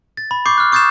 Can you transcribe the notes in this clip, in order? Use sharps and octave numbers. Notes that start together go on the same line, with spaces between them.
A6
B5
C#6 D6 G6 C7
F6 F#6
C#6 D#6 G6 A6 C7 E7